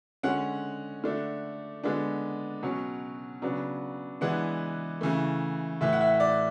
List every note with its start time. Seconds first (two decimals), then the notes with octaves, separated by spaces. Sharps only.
0.23 D3 G#3 C#4 F#5
1.04 D3 A3 D4
1.84 D3 G#3 B3 D4
2.63 B2 F#3 C#4
3.42 C#3 F#3 B3 D4
4.21 E3 G#3 B3 D4 F#5
5.01 C#3 E3 A3
5.81 A2 E3 A3 E5
5.93 F#5
6.01 E5
6.20 D5